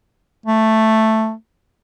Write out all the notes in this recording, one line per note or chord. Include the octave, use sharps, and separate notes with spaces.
A3